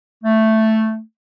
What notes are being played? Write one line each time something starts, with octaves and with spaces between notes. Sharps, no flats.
A3